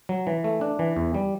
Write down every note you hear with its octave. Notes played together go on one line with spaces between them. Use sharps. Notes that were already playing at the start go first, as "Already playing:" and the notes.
F#3
E3
A3
D4
E3
E2
G3